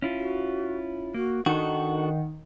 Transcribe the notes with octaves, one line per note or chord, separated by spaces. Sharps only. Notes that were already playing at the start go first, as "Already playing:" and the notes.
C#4 E4 F4
F#4
A#3 F#4
D#3 D4 F#4 A4 F#5